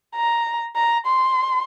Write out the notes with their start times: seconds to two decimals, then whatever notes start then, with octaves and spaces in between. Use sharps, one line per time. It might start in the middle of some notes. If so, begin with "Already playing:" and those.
0.16 A#5
0.76 A#5
1.06 C6